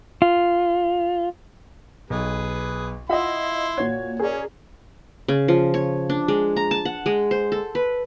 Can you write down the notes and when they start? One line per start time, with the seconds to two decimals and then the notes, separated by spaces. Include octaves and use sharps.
0.22 F4
2.10 B1 G#4 B4
3.09 E4 F4 D#5 E5 F#5 C6
3.77 A#2 F#4 C#5 G#6
4.19 C#4 G#4 A#4 D5
5.28 C#3
5.48 F3
5.74 C#5
6.09 D4
6.28 G#3
6.57 A#5
6.71 A5
6.85 F#5
7.06 G#3
7.31 C5
7.52 A4
7.75 B4